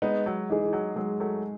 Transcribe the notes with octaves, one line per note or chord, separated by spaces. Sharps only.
G#3 B3 D#4
F#3
E3 D#4 G#4
E3
F#3
F#3 G#3
F#3 A3